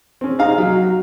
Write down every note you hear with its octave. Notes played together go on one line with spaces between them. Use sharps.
C4 C#4
D#4 G#4 F5 A#5
F#3